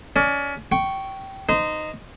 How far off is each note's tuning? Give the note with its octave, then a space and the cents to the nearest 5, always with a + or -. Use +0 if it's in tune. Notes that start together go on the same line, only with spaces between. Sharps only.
C#4 +30 D5 +25
G5 -20 C#6 +0
D#4 -10 C5 -25